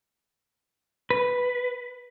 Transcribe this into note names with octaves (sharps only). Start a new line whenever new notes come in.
B4